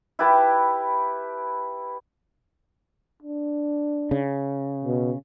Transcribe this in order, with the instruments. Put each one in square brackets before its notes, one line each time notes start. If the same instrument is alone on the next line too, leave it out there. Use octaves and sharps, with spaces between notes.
[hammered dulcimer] E4 G4 B4 A5
[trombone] D4
[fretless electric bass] C#3
[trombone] B2